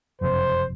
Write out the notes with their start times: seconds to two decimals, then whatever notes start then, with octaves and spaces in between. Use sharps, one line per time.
0.21 F#1 F2 C3 C5